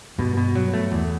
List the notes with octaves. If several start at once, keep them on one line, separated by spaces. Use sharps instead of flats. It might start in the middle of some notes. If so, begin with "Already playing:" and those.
G2 B2 G3
B2
F#3
A3
E2